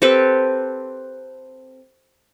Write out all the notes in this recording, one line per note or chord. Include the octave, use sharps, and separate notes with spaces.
C4 G4 A4 B4